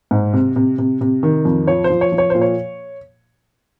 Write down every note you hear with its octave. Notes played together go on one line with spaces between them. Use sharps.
G#2
C3
C3
C3
C3
D#3
F2
F3 C#5
C5
F3
C#5
F3
C#5
A#2 C5
C#5